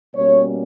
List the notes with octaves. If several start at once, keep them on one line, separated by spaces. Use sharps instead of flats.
B2 G3 A#3 C#4 C#5